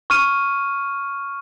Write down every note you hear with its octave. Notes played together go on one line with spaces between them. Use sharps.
C#6 F6 D#7